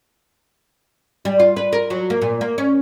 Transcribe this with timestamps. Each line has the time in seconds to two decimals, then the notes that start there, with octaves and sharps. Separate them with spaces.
1.25 G3
1.40 F4
1.56 B4
1.73 A#4
1.90 F#3
2.10 A#3
2.22 A#2
2.41 A#3
2.58 C#4